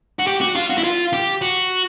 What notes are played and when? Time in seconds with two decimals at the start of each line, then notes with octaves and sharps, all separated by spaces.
0.19 F#4
0.27 G4
0.41 F#4
0.55 F4
0.70 F#4
0.78 E4
0.84 F4
1.13 G4
1.42 F#4